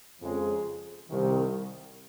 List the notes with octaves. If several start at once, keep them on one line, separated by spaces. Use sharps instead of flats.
F2 C#3 G#3
C2 C3 D#3